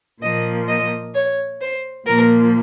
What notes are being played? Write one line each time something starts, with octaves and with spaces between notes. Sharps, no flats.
A#2 F3 A#3 D#5
D#5
C#5
C5
A#2 F3 A#3 A#4